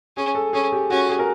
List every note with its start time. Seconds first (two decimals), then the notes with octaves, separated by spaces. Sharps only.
0.17 C#4 G#4
0.35 A4
0.53 C#4 G#4
0.72 G4
0.90 C#4 F#4
1.09 G#4
1.19 A#4